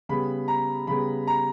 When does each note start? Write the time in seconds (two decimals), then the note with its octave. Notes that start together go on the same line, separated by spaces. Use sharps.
0.09 C#3 G3 B3 B5
0.48 A#5
0.87 C#3 G3 B3 B5
1.27 A#5